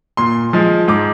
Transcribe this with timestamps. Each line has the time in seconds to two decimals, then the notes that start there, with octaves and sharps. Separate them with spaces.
0.17 A#2 C6
0.53 F3 G#3
0.88 G#2 D6